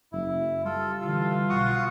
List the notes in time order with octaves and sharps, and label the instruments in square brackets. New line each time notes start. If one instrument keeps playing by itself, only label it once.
[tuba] F#1 [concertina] E4
[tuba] G3 [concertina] F4 A4
[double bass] D3 E3 [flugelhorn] F4 [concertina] A4
[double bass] B1 [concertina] F#4 C#6 D#6